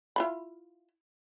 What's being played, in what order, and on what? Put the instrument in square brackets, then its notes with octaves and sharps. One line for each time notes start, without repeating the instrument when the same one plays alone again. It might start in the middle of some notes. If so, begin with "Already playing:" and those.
[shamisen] E4 F4 B5